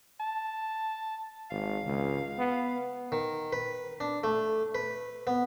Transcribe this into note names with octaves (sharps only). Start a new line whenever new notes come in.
A5
G#1 F5
C#2
B3
D#3
B4
D4
A3
B4
B3